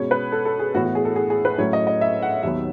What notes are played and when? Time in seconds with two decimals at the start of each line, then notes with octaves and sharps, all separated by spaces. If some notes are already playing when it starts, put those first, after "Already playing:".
Already playing: B2 G#3 C#4 C#5
0.11 B4
0.32 A4
0.45 A4
0.59 G#4
0.74 A2 E3 B3 F#4
0.85 F#4
0.95 G#4
1.05 A4
1.16 G#4
1.30 G#4
1.45 B4
1.58 A2 F#3 A3 C#4 C#5
1.73 D#5
1.87 D#5
2.01 E5
2.22 F#5
2.43 D#2 D#3 F#3 B3 E5